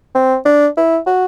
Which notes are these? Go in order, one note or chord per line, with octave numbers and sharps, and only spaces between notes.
C4
D4
E4
F#4